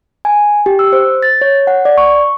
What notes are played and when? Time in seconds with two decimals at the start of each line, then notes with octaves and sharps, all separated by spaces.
0.25 G#5
0.66 G4
0.79 E6
0.93 C5
1.23 A6
1.41 C#5
1.67 F#5
1.85 D5
1.98 C#6